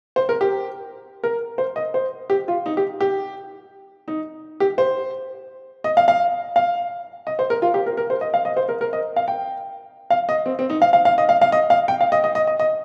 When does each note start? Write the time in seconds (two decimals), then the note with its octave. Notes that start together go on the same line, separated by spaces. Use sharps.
0.16 C5
0.29 A#4
0.41 G4
1.24 A#4
1.58 C5
1.76 D#5
1.94 C5
2.30 G4
2.48 F4
2.66 D#4
2.77 G4
3.01 G4
4.08 D#4
4.60 G4
4.78 C5
5.84 D#5
5.97 F5
6.08 F5
6.56 F5
7.27 D#5
7.39 C5
7.50 A#4
7.62 F4
7.74 G4
7.86 A#4
7.97 A#4
8.10 C5
8.21 D#5
8.34 F5
8.45 D#5
8.57 C5
8.69 A#4
8.81 A#4
8.93 D#5
9.16 F5
9.28 G5
10.10 F5
10.29 D#5
10.46 C4
10.59 C4
10.70 D#4
10.82 F5
10.93 F5
11.05 F5
11.18 D#5
11.29 F5
11.42 F5
11.52 D#5
11.70 F5
11.88 G5
12.01 F5
12.12 D#5
12.24 D#5
12.35 D#5
12.47 D#5
12.59 D#5